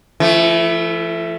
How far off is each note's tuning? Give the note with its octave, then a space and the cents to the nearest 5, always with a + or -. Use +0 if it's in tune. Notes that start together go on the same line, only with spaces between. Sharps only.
F3 -40 A3 +0 E4 +5